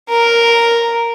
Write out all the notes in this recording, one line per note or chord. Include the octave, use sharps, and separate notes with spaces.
A#4